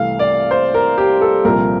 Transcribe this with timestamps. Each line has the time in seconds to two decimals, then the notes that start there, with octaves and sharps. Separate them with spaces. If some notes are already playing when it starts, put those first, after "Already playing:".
Already playing: C2 C3 E3 A3 F5
0.19 D5
0.51 C5
0.74 A#4
0.98 G4
1.21 A4
1.45 C2 A#2 F3 A#3 A#4